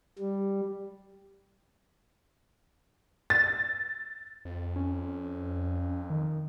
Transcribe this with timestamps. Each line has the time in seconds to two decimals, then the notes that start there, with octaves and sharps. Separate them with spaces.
0.19 G3
3.30 A6
4.45 F2
4.76 C#4
6.10 D#3